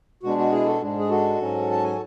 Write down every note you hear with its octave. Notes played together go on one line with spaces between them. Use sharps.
B2 G#3 D4 F#4
F#4
E4 G#4
F#4 A4
G#2 G#3 D4
G#4
F#4 A4
G#2 F#3 C#4
A5
G#5